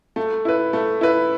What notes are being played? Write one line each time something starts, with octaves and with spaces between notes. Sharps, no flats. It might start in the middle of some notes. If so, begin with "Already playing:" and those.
A3
E4 B4
A3
E4 B4